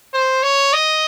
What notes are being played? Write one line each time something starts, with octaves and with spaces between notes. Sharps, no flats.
C5
C#5
D#5